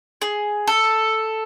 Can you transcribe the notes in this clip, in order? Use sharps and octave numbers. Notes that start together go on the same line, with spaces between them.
G#4
A4